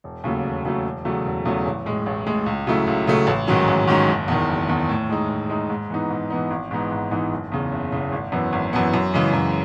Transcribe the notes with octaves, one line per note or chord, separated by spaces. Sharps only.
E1
D#2 C#3 F#3 A3
E1
D#2 C#3 F#3 A3
E1
E2 C#3 F#3 A3
E1
E2 C#3 F#3 A3
A1
A2 G#3
A1
A2 G#3
C#2
C#3 F#3 A3 E4
C#2
C#3 F#3 A3 E4
A1
G#2 D#3 F#3 C#4
A1
G#2 D#3 F#3 C#4
F#1
E2 D#3
F#1
E2 D#3
A2
G#3 D#4
A2
G#3 D#4
G#2
E3 B3 D#4
G#2
E3 B3 D#4
G#1
G#2 E3 B3 D#4
G#1
G#2 E3 B3 D#4
F#1
E2 C#3
F#1
E2 C#3
G#1
F#2 E3 B3
G#1
F#2 E3 B3
F#2
C#3 E3 G#3
F#2